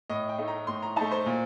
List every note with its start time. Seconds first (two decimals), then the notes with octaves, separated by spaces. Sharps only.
0.10 A2 D#5
0.29 G5
0.38 A3 D#4
0.48 A#5
0.67 A2 C6
0.82 A#5
0.96 A3 D#4 A5
1.12 C5
1.26 A#2